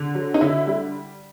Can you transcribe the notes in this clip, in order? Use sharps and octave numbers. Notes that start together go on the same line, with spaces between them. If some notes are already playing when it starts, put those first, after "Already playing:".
Already playing: D3
F#3
D#4
D3 E4
G3